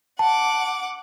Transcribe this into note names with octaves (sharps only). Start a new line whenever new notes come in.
F#5 A5 D6